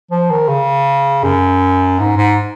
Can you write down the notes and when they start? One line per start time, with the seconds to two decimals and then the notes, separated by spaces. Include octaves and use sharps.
0.11 F3
0.31 D#3
0.49 C#3
1.24 F#2
1.99 G#2
2.17 G#2